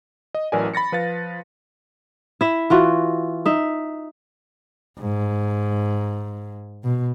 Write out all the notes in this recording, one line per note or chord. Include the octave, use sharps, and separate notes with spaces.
D#5
A1 E3 F#3 A#4 D5 G#5
B5 A6 A#6 C#7
F3 B4 F5 A6
E4 E5
E3 F4 F#4
D#4 E5
G#2
B2